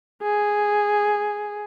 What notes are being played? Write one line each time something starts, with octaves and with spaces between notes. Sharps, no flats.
G#4